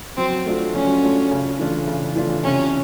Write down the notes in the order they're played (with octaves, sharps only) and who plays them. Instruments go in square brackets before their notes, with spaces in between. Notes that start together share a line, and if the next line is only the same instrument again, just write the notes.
[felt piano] F#3 [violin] C4
[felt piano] A3 D4 F4
[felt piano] F#3 [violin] C#4
[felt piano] A3 D4 F4
C#3
E3 A3 D4 F4
C#3
E3 A3 D4 F4
[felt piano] C3 [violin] C#4